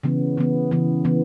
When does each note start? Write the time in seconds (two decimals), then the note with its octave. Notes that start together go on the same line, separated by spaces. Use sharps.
0.03 C#3 E3 B3
0.37 C#3 E3 B3
0.71 C#3 E3 B3
1.05 C#3 E3 B3